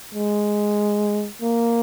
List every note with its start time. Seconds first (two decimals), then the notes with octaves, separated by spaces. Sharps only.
0.14 G#3
1.42 A#3